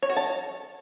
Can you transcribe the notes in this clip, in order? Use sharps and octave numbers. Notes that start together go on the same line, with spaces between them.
C#5
F#4
A5